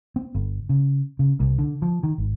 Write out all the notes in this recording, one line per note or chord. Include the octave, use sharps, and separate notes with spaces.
C4
G1
C#3
C#3
C2
D3
F3
D#3
G#1